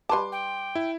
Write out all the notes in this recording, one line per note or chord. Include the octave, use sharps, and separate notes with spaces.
G3 B4 A5 C6 D6
G5
E4